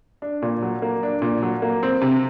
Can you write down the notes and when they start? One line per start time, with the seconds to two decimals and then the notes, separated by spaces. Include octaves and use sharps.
0.22 D4
0.42 A#2
0.62 F#3
0.82 A#3
1.03 D4
1.22 A#2
1.42 F#3
1.62 A#3
1.83 C4
2.02 C3